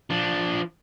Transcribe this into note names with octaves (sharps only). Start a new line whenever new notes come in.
F3 D4